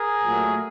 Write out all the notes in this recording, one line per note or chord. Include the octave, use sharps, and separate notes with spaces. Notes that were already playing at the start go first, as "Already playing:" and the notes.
Already playing: G#4 A#4
A#2 F#3 A3